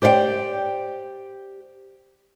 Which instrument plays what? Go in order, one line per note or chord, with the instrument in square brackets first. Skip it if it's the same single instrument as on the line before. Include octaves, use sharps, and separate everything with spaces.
[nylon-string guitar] G4 C5 D5 F5 G5